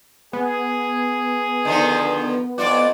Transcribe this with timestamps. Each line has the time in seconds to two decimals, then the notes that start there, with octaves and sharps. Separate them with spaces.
0.33 B3 G#4
1.65 D3 D#3 F3
2.58 F2 F4 F#4 D5